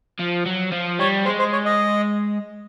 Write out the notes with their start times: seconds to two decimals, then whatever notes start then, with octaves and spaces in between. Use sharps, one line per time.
0.20 F3
0.46 F#3
0.72 F3
0.99 G3 C#5
1.25 G#3 C5
1.39 C5
1.53 C#5
1.66 D#5